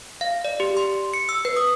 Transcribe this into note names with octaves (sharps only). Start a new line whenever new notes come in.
F5
D5
G4
C6
C#7
E6
B4
D#6